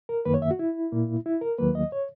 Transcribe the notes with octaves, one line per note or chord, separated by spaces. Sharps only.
A#4
F#2 D#3 A#3 B4
C#5
E5
F#4
E4
A#2 A#3
E4
A#4
D#2 D#3 F#3 A#3 B4
D#5
C#5